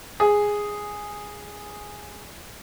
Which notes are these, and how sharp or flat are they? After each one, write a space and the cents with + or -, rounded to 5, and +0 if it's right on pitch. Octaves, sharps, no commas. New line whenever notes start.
G#4 -5